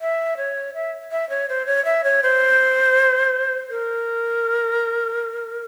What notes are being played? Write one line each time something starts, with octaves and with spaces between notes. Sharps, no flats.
E5
C#5
E5
E5
C#5
C5
C#5
E5
C#5
C5
A#4